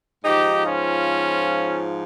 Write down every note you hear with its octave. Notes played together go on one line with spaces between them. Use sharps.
G#2 F3 D#4 G4
C#4 F4